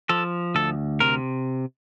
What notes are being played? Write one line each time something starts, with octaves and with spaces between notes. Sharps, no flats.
F3 A4
D2 A4
C3 A#4